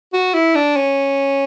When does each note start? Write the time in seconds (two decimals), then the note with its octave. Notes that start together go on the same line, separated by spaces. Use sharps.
0.13 F#4
0.34 E4
0.55 D4
0.76 C#4